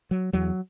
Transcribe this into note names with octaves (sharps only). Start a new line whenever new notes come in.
F#3
E2 F#3